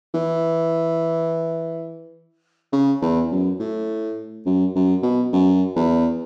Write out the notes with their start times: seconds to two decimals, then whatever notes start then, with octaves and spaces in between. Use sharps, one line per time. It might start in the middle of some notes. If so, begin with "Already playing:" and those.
0.14 E3
2.72 C#3
3.02 E2
3.31 F#2
3.59 A2
4.46 F#2
4.75 F#2
5.03 B2
5.32 F#2
5.76 E2